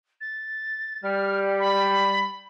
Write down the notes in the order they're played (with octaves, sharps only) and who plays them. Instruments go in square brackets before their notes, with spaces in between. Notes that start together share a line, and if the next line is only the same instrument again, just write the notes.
[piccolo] A6
[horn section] G3 [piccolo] F6
[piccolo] B5